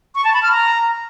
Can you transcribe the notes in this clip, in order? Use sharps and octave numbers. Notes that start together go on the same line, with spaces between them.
C#6
A5
B5
F6
A#5